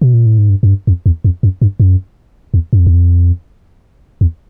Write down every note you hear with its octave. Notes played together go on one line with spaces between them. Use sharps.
B2
A#2
A2
G#2
G2
F#2
G2
F2
E2
F2
F#2
G2
F#2
E2
F#2
F2
E2
F2
E2